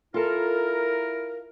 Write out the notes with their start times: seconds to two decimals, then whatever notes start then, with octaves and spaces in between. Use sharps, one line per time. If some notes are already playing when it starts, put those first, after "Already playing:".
0.14 E4 F4 A4 A#4